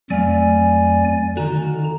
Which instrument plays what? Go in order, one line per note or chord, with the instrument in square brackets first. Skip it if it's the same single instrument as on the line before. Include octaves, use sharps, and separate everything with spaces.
[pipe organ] F2 D5 G#5 [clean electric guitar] F#3 A3 F5
[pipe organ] D3 A#5 [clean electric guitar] D#3 F#4